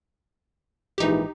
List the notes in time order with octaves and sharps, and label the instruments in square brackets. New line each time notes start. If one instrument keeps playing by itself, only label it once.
[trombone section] A#1 G#2 E3 [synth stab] D#4 G4